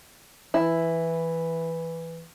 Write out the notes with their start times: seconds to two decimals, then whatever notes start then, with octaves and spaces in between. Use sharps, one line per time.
0.54 E3 E4